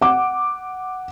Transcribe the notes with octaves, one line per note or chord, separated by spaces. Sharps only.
F#5 D6